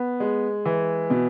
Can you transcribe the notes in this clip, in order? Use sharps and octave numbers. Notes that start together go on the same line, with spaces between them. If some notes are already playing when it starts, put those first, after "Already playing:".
Already playing: B3
G#3
E3
B2